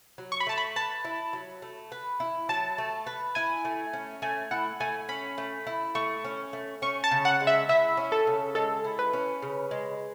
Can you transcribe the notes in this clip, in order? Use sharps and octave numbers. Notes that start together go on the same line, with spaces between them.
F#3
C#6
B5
A3 A5
B5
B4 A5
E4
F#3
A3
B4
E4
F#3 A5
A3
B4
E4 G#5
A3
C#4
A3 G#5
E4 F#5
A3 G#5
C#4 B5
A3
E4
A3 C#6
C#4
A3
C#4 C#6
A5
C#3
F#5
G#3
E5
E4 E5
C#4
A4
C#3
G#3 A4
E4
B4
C#4
C#3
G#3